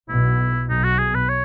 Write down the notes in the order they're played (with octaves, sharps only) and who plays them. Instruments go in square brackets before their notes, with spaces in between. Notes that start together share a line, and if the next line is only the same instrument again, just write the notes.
[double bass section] B1 B2 [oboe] E4
[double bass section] B1 B2 [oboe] D#4
[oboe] F#4
G#4
B4
C#5